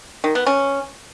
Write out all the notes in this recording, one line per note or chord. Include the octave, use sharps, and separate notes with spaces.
D#3
B3
C#4